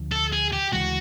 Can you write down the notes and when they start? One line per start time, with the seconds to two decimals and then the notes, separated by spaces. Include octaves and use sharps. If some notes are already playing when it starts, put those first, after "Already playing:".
Already playing: D2 D3 F3
0.12 A4
0.33 G#4
0.53 G4
0.72 D2 C#3 E3 G#3 F#4